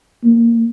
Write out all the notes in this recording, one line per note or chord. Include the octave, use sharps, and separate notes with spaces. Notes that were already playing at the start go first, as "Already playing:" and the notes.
A#3